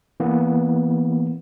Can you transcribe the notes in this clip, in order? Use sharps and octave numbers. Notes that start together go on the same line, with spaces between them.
E3 A#3 B3